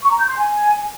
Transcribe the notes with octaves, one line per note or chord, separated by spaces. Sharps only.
C#6
A#5
G6
C6
G#5